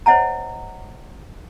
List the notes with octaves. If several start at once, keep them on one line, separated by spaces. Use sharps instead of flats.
C5 C#5 D#5 F#5 G#5 A#5